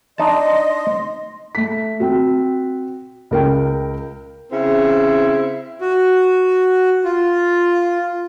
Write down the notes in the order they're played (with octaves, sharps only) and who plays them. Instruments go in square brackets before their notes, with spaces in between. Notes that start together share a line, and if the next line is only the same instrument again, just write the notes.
[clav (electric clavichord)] D4 D#4 A5 [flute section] D#5 C6
[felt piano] A3 B6
C4 F#4
C#2 A#4 G5
[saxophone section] C#3 C4 E4
[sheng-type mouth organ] F#4
F4